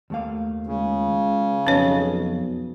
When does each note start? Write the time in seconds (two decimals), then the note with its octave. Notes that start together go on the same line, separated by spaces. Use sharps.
0.10 D#2 A3 F5
0.67 C#2 C#3
1.67 B1 F2 C#4 B4 C#5 D#5